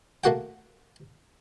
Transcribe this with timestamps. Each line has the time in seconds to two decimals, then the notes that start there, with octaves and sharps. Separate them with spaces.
0.24 A3 A#3 F#4 F#5 G5